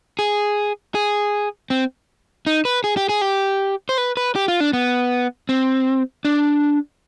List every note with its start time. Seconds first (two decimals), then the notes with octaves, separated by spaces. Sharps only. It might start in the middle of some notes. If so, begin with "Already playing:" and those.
0.19 G#4
0.95 G#4
1.70 C4
2.47 D#4
2.65 B4
2.84 G#4
2.97 G4
3.09 G#4
3.21 G4
3.89 C5
3.98 B4
4.17 B4
4.36 G4
4.48 F4
4.60 D4
4.73 B3
5.49 C4
6.25 D4